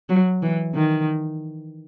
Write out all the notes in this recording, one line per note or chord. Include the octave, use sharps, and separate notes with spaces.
F#3
E3
D#3